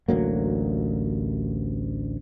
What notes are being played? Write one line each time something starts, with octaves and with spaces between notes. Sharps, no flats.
A1 D2 F#3 A#3